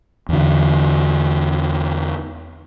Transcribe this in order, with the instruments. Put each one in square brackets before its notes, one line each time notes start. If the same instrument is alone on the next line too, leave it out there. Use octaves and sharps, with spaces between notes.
[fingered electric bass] E2 D3